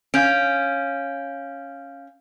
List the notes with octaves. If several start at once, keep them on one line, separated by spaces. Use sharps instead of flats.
C#4 F5 G6 D7